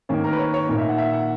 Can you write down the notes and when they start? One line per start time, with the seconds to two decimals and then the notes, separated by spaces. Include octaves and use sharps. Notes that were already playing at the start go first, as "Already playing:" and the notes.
0.09 D#3 A#3 C#4
0.24 A#4
0.33 B4
0.39 C#5
0.54 C#5
0.69 A#2 A#3 D#4
0.78 E5
0.89 F#5
0.98 E5
1.13 F#5